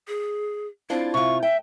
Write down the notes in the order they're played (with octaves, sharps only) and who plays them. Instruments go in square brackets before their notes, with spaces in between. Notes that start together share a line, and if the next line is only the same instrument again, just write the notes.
[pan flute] G#4
[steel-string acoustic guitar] C4 D4 F4 [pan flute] E4
[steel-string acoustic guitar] C3 F4 [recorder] C#6
[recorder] E5 [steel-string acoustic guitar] G5